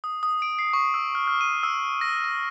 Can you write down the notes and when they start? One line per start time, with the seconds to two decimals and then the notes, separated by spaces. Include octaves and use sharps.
0.04 D#6
0.23 D#6
0.42 D7
0.59 C7
0.73 C#6
0.94 E6
1.15 F6
1.28 F6
1.41 D#7
1.63 E6
2.01 A#6
2.24 A#6